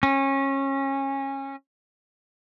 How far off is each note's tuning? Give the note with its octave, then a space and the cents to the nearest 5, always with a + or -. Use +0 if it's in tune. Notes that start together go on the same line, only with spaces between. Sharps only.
C#4 -25